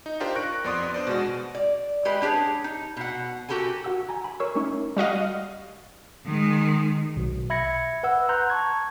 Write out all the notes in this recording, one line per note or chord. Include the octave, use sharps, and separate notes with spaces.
D#4
D4 F4 G4 A#4 C5
C#6 F#6 A#6 D7
F2 B3 D5 C6 D#6
D4 C5 D5
B2 G#3 F#4
D5
G#3 G4 B4
D4 G4 G#4 C#5
D#4
B2 F#5
F#4 G4 A4 A#4 G#5
F#4 F#5 E6
G#5 A#5
B5
A#4 C#5 C#6 E6
A3 C#4 D#4 C#6
G3 F#4 D#5 F5
D#3 G#3
B1 B2
E5 B5 G#6 A#6 C#7
B4 F#5 E6
A#5 C6 F#6 G6
A5 C#6 G#6